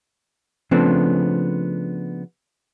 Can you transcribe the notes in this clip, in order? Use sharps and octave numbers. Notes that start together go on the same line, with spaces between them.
C#3 F3 A3 B3 C4 D4